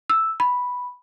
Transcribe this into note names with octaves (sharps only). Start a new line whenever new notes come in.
E6
B5